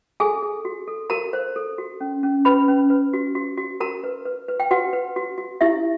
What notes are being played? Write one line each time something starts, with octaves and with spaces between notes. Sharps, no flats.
G#4 A4 G#5
A4
F#4
A4
F#4 A#4 A#5
C5
A4
F#4
C#4
C#4
C#4 B4 B5
C#4
B4
F#4
F#4
F#4
F#4 A#4 A#5
B4
B4
B4
G5
F#4 B4 F#5
B4
F#4
F#4
E4 G4 E5